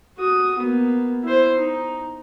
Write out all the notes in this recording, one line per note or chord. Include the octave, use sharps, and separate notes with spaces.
F#4 D#6
A#3 B3
E4 C5
D#4